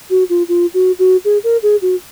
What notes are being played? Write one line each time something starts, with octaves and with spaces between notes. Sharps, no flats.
F#4
F4
F4
F#4
F#4
G#4
A#4
G#4
F#4